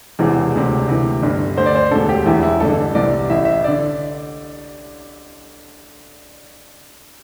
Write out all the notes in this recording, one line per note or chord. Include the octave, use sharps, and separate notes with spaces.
E1 E2 C3 E3
E1 D2 C3
D2 C3 E3
G1 G2 D3
D2 D3 C5
D5
C5
E1 D2 D3 A4
G4
E1 E2 E3 E4
E4
A1 G2 D3 A4
C2 C3 E3 D5
A1 A2 E3 E5
E5
D3 D5